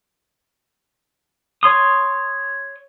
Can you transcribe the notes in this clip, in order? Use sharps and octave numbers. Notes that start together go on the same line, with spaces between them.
C#5 C6 D#6